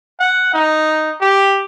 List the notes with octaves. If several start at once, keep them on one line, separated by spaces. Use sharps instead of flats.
F#5
D#4
G4